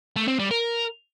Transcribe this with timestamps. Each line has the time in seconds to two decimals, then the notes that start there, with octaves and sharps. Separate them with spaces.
0.16 A3
0.28 C4
0.39 G3
0.51 A#4